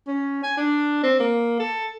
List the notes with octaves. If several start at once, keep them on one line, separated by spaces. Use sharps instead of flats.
C#4
G#5
D4
C4
A#3
A4